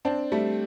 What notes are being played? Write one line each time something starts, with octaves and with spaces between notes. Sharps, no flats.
C4 D4
G3 A3